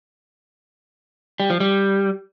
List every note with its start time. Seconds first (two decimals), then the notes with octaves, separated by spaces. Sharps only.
1.40 G3
1.50 F3
1.60 G3